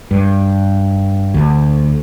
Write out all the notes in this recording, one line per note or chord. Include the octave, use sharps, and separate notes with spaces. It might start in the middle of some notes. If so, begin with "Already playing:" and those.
G2
D2